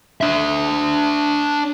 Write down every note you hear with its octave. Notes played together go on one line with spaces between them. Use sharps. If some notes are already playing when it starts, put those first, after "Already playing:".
D4 E5